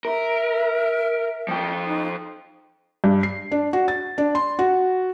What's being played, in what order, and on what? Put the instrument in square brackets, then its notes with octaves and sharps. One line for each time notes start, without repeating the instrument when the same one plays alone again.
[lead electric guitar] A#4 [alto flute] E5
[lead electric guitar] F3 G5
[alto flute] D#4
[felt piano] G2
C7
D4
F#4
A6
D4
C6
F#4